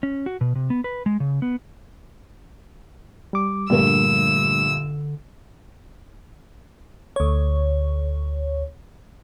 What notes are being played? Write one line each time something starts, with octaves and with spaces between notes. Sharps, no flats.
C#4
F#4
B2
C3
B3
B4
G#3
C#3
B3
G3 D6
A#1 G2 D3 G3 A3 A#4 E6
D2 C#5